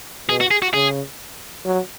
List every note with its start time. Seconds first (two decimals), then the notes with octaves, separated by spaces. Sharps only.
0.29 B2 G#4
0.41 F#4
0.51 G#4
0.62 F#4
0.74 C#3 G#4
1.65 F#3